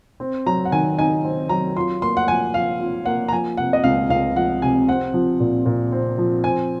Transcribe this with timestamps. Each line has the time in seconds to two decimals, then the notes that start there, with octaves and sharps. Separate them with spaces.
0.20 C4
0.46 F#3 A#5
0.65 F#5
0.72 D#3 G#5
0.98 D#4 G#5
1.24 C4
1.49 F#3 A#5
1.76 F4 C6
2.02 A#3 C6
2.17 F#5
2.28 F3 G#5
2.54 F3 F5
2.80 F4
3.06 A#3 F#5
3.28 A#5
3.32 F3 G#5
3.57 C3 F#5
3.73 D#5
3.84 C#2 F5
4.10 C#2 F5
4.36 F3 F#5
4.62 C3 G#5
4.88 C4 F#5
5.14 F3
5.40 A#2
5.66 A#2
5.92 C4
6.18 F3
6.44 C4 G#5